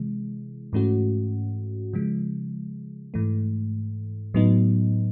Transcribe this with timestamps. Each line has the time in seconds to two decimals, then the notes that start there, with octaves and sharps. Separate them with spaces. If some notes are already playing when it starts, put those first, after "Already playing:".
Already playing: C3 E3 G#3
0.73 G#2 E3 A3 C#4 F#4
1.93 C#3 F3 G#3
3.14 G#2 E3 A3
4.34 A2 F#3 B3 D#4